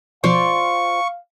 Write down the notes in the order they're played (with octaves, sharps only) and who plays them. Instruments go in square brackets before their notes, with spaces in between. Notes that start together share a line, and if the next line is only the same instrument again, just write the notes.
[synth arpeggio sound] B2 F3 [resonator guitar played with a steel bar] F4 C5 D5 [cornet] F5 [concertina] C#6